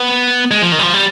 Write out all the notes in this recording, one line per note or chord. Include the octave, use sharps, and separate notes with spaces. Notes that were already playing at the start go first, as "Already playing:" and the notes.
Already playing: B3
G#3
F3
D#3
G3
F3
G3